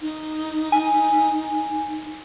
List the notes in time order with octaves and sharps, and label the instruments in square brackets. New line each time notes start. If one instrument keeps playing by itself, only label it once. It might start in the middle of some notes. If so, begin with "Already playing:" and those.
[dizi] D#4
[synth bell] G#5